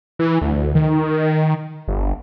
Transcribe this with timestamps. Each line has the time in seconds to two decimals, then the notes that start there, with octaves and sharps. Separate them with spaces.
0.19 E3
0.41 D2
0.75 D#3
1.88 G1